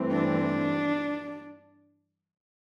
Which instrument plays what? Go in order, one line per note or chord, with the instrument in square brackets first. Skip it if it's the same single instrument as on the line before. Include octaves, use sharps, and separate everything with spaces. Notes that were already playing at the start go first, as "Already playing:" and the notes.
Already playing: [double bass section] G2 E3 A3 C4
[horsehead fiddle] D4